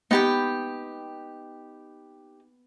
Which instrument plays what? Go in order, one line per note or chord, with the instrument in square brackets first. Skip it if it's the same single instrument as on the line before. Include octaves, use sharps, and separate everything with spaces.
[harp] B3 [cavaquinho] D#4 G4 G5